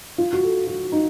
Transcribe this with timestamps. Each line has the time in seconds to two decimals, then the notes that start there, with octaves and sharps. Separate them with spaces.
0.18 F4
0.33 F#4
0.43 A4
0.67 F#4
0.92 D#4